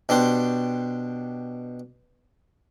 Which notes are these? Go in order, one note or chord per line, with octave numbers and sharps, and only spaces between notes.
B2 D4 G4 C5